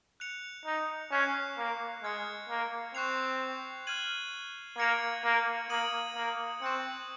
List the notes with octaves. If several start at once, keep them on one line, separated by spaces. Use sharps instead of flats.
F#6 C#7 F7
D#4
C#4 C#6 F#6 C7
A#3
G#3 F6 G#6 C#7
A#3
C4 C#6 F#6 C7 F7
F6 G#6 D#7 F#7
A#3 G#6 C#7 F7
A#3
A#3 D#6 G#6 D#7 F#7
A#3
C4 C#6 F#6 C#7